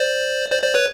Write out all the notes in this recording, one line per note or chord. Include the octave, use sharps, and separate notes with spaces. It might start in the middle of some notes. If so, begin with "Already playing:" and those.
Already playing: C5 D5
C5 D5
C5 D5
B4 C#5